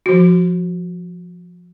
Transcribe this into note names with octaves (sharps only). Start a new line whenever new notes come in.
F3 F#4